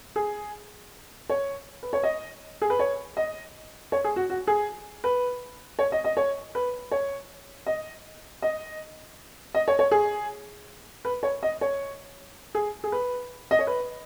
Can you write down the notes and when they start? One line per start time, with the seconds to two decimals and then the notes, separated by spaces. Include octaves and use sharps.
0.16 G#4
1.30 C#5
1.83 B4
1.93 C#5
2.03 D#5
2.62 G#4
2.70 B4
2.79 C#5
3.17 D#5
3.92 C#5
4.04 G#4
4.16 F#4
4.30 F#4
4.47 G#4
5.04 B4
5.79 C#5
5.92 D#5
6.04 D#5
6.17 C#5
6.55 B4
6.92 C#5
7.66 D#5
8.42 D#5
9.54 D#5
9.68 C#5
9.79 C#5
9.91 G#4
11.05 B4
11.23 C#5
11.43 D#5
11.61 C#5
12.55 G#4
12.84 G#4
12.92 B4
13.51 D#5
13.59 C#5
13.67 B4